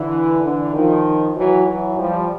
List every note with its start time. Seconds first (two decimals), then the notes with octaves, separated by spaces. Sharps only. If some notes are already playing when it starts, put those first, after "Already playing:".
Already playing: D3 E3
0.43 D3 E3
0.74 D#3 F3
1.36 E3 F#3
1.66 E3 F#3
1.98 F3 G3